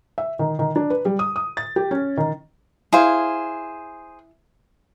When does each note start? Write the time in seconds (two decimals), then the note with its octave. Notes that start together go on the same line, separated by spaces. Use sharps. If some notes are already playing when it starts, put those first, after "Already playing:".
0.18 E5
0.39 D#3
0.59 D#3
0.76 D4
0.90 B4
1.05 G3
1.19 D#6
1.36 D#6
1.57 A6
1.76 G4
1.91 C#4
2.17 D#3
2.93 E4 G#4 C5 F5